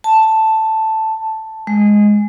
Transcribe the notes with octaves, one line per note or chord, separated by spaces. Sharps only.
A5
G#3